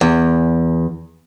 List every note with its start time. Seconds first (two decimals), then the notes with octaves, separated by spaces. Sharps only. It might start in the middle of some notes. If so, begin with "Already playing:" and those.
0.01 E2